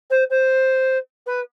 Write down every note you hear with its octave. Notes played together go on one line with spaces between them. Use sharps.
C5
C5
B4